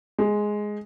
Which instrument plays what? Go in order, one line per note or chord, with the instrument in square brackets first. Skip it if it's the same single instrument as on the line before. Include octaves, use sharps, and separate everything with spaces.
[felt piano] G#3